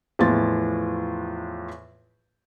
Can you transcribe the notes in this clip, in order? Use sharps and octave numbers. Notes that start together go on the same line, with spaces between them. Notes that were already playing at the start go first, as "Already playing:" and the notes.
E2 A2 F3 F4 A6